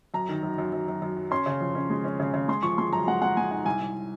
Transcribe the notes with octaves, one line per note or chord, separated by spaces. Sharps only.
F#2 A#5
D#3
F#2
F#2
F#2
F#2
F#2
F#3
C#4 C6
C#3
F2
C#4
G#3
C#4
C#3
C#3
G#3 C6
F3 C#6
G#3 C6
F#2 A#5
G#3 F#5
G#3 F#5
G#3 G#5
D#4 F#5
C2 G#5
C2